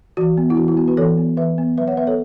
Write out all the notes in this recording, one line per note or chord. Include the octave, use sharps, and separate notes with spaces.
E3 F#4
B3
E4
E3 F#4
E4
B3 F#4
F#4 B4
E3 A4 C#5
B3
E3 B4 E5
B3
F#3 B4 E5
C#5 F#5
B3 B4 E5
A4 C#5